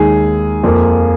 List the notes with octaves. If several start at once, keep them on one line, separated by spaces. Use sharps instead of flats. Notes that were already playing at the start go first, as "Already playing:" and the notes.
Already playing: D#2 D#3 G#3 G#4
F2 F3 A#3